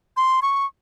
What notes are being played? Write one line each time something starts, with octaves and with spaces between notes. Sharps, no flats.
C6
C#6